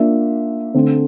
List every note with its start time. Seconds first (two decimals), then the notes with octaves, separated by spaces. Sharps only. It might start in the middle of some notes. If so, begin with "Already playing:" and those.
Already playing: A#3 D4 F4 E5
0.74 D3 A3 C4